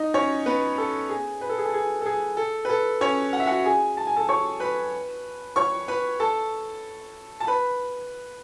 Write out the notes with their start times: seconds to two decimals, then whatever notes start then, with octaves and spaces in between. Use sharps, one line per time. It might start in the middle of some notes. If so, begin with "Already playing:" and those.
Already playing: D#4 D#5
0.14 C#4 C#5
0.46 B3 B4
0.78 A4
1.09 G#4
1.41 B4
1.49 A4
1.58 G#4
1.66 A4
1.74 G#4
2.01 A4
2.06 G#4
2.37 A4
2.65 B4
2.69 A4
3.01 C#4 C#5
3.33 F#5
3.40 E5
3.47 F#4 F#5
3.65 G#4 G#5
3.97 A5
4.07 G#5
4.17 A4 A5
4.29 C#5 C#6
4.60 B4 B5
5.56 C#5 C#6
5.88 B4 B5
6.20 A4 A5
7.40 A5
7.47 B4 B5